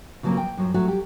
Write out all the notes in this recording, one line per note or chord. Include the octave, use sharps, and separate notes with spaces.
C#3 F3 F#3 A3 A#3 C4
G5
F#2 F3 F#3
F#3 A3 F#4
G4